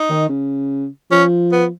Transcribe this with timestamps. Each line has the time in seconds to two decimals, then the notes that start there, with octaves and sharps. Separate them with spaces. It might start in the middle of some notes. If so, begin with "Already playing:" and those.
Already playing: D#4
0.10 D#3
0.29 C#3
1.11 F3 C#4
1.52 B3